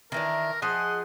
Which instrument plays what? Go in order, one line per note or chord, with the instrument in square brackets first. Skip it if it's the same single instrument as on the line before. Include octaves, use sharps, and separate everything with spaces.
[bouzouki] D#3 E3 D4 [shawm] A#4
[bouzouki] F3 G#4 D#5 [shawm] F#5